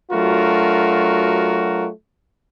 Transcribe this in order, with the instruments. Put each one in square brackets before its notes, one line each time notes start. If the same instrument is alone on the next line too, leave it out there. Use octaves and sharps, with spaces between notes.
[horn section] F#3 A3 D4 F4 F#4 A#4